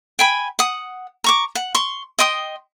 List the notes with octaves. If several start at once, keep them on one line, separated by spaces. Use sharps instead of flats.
G5 G#5 B5
F#5 D#6
A#5 C#6 D6
F#5
C6 C#6
D#5 G5 C6 D#6